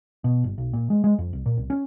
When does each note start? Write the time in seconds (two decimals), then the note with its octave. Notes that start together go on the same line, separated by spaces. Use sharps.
0.24 B2
0.44 G1
0.58 B1
0.73 A#2
0.90 G#3
1.04 G#3
1.18 F2
1.33 C2
1.46 A#2
1.57 C2
1.70 C#4